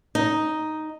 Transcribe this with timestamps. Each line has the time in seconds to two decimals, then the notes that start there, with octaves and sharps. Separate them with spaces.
0.15 D#4